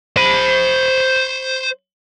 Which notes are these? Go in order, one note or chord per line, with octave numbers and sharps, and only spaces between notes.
C5 B5